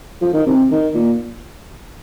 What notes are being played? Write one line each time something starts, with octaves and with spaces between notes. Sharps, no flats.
F3
D#3
C3
D#3
A#2